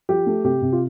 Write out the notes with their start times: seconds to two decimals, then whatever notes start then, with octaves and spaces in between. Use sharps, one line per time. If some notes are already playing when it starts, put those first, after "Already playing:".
0.09 F3 G4
0.26 A3
0.44 C3 G4
0.62 C3
0.72 F4